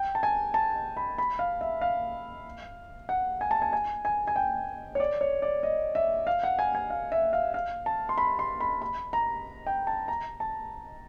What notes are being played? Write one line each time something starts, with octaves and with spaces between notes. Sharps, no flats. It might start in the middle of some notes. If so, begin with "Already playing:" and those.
Already playing: G5
A5
G#5
A5
B5
B5
F5
E5
F5
F#5
G#5
A5
G#5
G#5
G#5
G#5
G5
C#5
D5
C#5
D5
D#5
E5
F5
F#5
G#5
G#5
F5
E5
F5
F5
A5
C6
B5
C6
B5
B5
A#5
G5
A5
A#5
A5